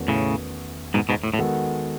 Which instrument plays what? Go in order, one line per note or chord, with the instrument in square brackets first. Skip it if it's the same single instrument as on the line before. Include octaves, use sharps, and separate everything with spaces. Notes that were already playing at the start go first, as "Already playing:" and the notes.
Already playing: [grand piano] E2 D#3 A3 C#4 F#4
[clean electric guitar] A2 C#3
G#2 B2
G#2 B2
A2
A2
[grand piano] D#3 G#3 B3 F#4 A4